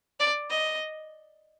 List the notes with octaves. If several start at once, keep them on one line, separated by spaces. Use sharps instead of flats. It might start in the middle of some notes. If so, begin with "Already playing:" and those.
D5
D#5